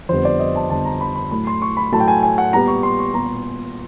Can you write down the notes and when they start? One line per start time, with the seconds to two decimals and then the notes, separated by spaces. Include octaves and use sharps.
0.09 F2 D3 G3 B3 C5
0.25 D5
0.40 D#5
0.56 A5
0.70 F2 D3 G3 B3 A5
0.85 A#5
1.01 B5
1.16 B5
1.31 A2 F#3 A3 B5
1.47 C6
1.62 C#6
1.77 B5
1.92 A2 F#3 A3 A5
2.00 G5
2.08 G#5
2.23 G#5
2.38 F#5
2.53 A#2 G3 B3 A#5
2.68 C#6
2.83 C6
2.99 C#6
3.13 A#2 G3 B3 A#5